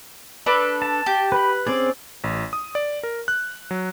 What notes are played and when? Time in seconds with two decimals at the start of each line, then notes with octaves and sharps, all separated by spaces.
0.46 D4 A4 B4
0.82 A5
1.06 G4
1.32 B4 B5
1.67 C4 C#4 G#4 D5
2.24 A1
2.53 D#6
2.75 D5
3.03 A#4
3.28 F#6
3.71 F#3